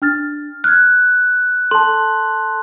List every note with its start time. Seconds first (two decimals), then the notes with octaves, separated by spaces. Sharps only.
0.02 D4 F6 A6
0.64 F6 F#6 G#6
1.71 A4 A5 C6